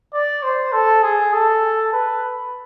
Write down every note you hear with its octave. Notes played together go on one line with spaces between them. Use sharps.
D5
C5
A4
G#4
A4
B4